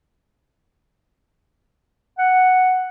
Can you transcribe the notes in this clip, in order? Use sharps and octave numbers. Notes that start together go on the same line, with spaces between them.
F#5